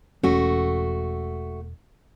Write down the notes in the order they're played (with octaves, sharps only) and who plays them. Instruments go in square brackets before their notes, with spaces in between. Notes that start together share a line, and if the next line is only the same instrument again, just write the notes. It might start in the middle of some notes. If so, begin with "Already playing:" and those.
[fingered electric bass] E1 C#4 [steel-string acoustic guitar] A3 F#4